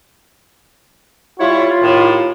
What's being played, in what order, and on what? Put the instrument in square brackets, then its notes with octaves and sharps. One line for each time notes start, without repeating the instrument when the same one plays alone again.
[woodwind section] G3 E4 C#5 [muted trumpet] F4
[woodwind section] D#2 A2